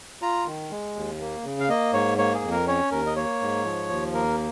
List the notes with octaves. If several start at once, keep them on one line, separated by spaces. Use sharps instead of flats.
F4 A#5
D#3
G#3
D#2
A#3
C#3
F5
A#3 D#5
G#2 C#5
A#3 C#5
G#4
F2
A#4
C#4 C#5
D#2 A#4
D#5
A#3 C#5
G#2
F3
D#2
A#3 A#4